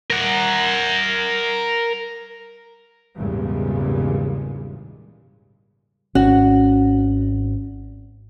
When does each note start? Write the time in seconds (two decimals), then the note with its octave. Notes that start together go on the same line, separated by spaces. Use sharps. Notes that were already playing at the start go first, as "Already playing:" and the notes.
0.10 A#4 F#5
3.16 G#1 E2 A#2 C#3 G3 G#3
6.15 G#1 C#4 F#4